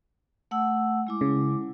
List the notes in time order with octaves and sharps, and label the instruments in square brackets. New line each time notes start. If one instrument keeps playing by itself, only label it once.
[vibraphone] A3 F#5 E6
G#3 E4 D6
[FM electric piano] C#3